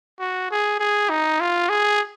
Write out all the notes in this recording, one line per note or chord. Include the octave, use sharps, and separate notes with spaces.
F#4
G#4
G#4
D#4
F4
G#4